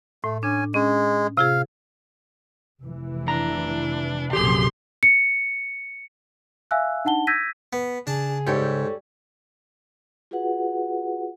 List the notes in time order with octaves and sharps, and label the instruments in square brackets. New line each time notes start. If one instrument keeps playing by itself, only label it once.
[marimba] A2 [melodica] A3
[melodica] C#4 G#5 [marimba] D4
[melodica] G#3 [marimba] C#4
[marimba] C3 F4 G#4 [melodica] F5
[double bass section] F1 E3
[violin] D4 [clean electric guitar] A#5
[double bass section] A#1 F#2 C3 [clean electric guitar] G4 G#4 [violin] C6
[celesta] C#7
E5 F5 G#5 E6 F#6
D4 D#4 F#5 A5 G7
E6 G6 G#6 A#6 B6 D#7
[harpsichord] B3
[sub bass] C#3 [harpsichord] D4 A5 [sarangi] G#4
[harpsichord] G#2 [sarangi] G3 [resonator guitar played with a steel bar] G4 A4 C#5
[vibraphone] F4 F#4 G#4 B4 F#5